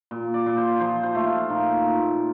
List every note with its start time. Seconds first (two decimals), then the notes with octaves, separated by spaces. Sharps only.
0.11 A#2
0.34 D5
0.46 A#2
0.57 C5
0.80 F3 C5
1.03 C5
1.15 A3
1.26 F4
1.50 A#2 D#4
1.85 A#2